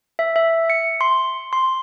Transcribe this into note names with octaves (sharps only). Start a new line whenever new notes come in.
E5
E5
C#7
C6
C6